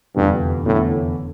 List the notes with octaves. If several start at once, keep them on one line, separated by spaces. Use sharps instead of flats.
F1 E2 G2 D3
F1 E2 A2 D3